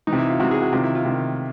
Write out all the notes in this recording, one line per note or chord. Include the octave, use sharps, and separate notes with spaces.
E3 D#4
C3
E4
F4
C3 E3 F#4
G#4
F#4
C3 D#3 F4
E4
F4
C3 D#3